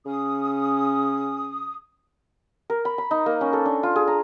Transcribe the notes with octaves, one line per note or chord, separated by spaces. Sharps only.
C#3 C#4 D#6
A#4
B5
B5
D#4
A#3
C#4
A4
D4
F4
G#4
A#5